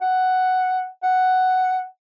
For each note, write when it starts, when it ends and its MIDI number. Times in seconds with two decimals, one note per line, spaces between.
0.01 0.86 78
1.03 1.84 78